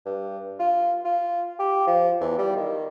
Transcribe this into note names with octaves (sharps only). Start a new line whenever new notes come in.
G2
F4
F4
G4
F3
E2
G3
D#3